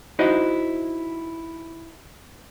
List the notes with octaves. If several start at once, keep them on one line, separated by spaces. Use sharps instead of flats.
D#4 E4 F#4 C5 D#5